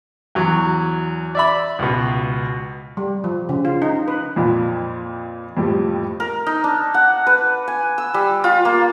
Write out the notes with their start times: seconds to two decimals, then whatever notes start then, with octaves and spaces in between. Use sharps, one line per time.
0.35 E2 F#3
1.35 D5 E5 B5
1.79 C#2 B2
2.97 G3
3.24 F3
3.49 C#3
3.65 F4
3.82 D#4
4.08 B4
4.36 F2 A#2 B5
5.57 F2 A2 F3 G3
6.20 A#4
6.47 D#4
6.64 D4
6.94 F#5
7.27 B4
7.68 G#5
7.98 E6
8.14 G3
8.44 F4
8.65 A#3